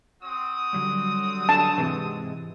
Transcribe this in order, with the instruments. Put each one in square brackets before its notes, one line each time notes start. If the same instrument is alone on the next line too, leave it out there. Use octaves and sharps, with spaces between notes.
[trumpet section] C4 F#4 D#6
[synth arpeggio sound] D3 F#3 G3
[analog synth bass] D4 [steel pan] A5
[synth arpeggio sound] G#2 C3 G#3 [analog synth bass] E3